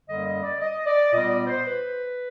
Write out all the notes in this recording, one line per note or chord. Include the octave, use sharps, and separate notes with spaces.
F#2 D3 G3 A#3 D#5
D#5
D5
D#5
D5
A#2 G3 B3 D#5
D5
C5
B4